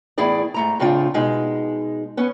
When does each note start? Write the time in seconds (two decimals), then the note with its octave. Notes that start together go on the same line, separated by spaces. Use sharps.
0.18 E2 A2 E4 G#4 D5
0.54 G#2 A3 A#5
0.80 A2 C#3 C4 D4 F4
1.14 B2 G#3 D#4
2.17 B3 C#4